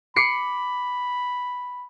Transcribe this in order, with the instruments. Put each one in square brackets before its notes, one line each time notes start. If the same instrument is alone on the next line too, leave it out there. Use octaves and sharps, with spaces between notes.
[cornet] B5 [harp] D6 C7 C#7